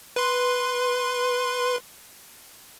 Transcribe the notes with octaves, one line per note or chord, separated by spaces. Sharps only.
B4 C6